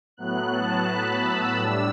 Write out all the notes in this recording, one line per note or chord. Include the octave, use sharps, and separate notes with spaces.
A2 F#3 B3 F#6
A5
B5
E6
A2 G3 D4